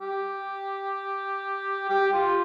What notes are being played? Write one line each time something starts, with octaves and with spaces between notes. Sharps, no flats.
G4
G4
F4